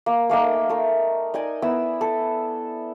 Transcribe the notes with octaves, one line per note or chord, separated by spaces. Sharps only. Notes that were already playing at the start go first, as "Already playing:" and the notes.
A#3
A3 A#3 D#4 G#5
A3 A#4
D#4 D5 D#5 G#5
B3 E4 E6
A4